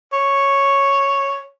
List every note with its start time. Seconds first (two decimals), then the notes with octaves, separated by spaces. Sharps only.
0.13 C#5